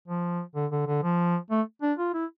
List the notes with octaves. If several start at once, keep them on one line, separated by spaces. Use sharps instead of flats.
F3
D3
D3
D3
F3
A3
D4
F4
E4